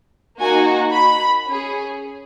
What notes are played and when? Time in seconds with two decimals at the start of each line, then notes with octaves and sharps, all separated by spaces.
0.40 A#3 D#4 F#4 G#5
0.93 B5
1.47 C#4 G#4